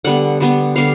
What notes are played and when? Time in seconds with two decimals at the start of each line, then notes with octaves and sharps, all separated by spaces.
0.05 D3 G3 B3 F#5
0.40 D3 G3 B3
0.76 D3 G3 B3 F5